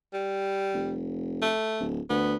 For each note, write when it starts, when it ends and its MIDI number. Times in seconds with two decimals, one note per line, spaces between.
0.13 1.00 55
0.74 1.50 29
1.42 1.86 57
1.80 2.00 26
2.10 2.36 38
2.10 2.35 59